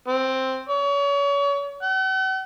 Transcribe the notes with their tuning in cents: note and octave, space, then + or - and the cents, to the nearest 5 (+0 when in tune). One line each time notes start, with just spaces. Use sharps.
C4 +5
C#5 +35
F#5 +45